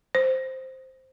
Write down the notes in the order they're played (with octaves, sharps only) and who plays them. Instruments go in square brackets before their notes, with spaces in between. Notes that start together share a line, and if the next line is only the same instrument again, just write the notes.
[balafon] C5